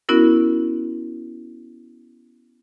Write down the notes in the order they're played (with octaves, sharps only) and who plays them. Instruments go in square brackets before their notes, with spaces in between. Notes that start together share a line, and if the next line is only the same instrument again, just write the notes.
[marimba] B3 C#4 E4 F#4 A#4